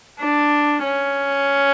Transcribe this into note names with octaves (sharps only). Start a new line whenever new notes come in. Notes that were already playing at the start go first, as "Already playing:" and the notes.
D4
C#4